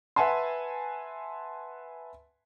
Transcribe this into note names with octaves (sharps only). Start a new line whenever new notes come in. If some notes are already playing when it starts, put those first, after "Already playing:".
B4 E5 F#5 G#5 A5 C6